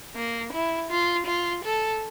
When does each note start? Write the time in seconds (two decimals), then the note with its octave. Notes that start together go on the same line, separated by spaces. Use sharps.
0.16 A#3
0.53 E4
0.90 F4
1.26 F4
1.64 A4